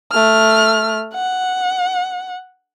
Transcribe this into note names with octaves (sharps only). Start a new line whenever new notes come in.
A3 F6
F#5